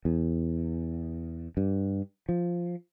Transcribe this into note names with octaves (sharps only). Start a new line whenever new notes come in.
E2
G2
F3